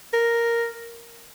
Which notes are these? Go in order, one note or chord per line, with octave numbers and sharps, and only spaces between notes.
A#4